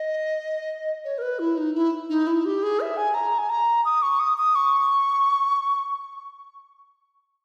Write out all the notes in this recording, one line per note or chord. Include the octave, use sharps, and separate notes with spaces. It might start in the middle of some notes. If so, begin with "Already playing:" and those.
Already playing: D#5
C#5
A#4
B4
E4
D#4
E4
D#4
E4
G4
G#4
E5
G#5
A#5
G#5
A#5
D#6
C#6
D#6
D#6
C#6